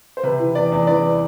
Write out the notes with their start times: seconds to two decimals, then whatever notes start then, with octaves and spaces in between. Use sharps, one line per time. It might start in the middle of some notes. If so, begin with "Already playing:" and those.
0.17 C5
0.23 C3 B4
0.39 E3
0.55 E2 B4 D5
0.72 E2
0.87 E2 B4 D5